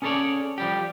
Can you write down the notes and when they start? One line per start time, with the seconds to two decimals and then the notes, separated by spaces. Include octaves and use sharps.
0.02 C#4 G#4 A4 B4 C#5 D5
0.58 F3 G3 G4